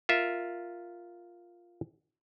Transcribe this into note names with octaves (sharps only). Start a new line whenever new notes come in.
F4 A#4 E5